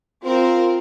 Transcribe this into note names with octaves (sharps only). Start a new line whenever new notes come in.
C4 F4 A#4 C5